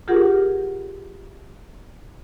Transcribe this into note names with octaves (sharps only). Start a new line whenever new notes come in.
F4 G4 G#4 A#4 F#5